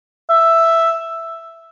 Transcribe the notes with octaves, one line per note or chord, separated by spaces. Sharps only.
E5